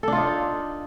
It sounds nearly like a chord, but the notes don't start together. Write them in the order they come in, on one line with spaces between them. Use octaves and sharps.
A4 D4 F4 D#4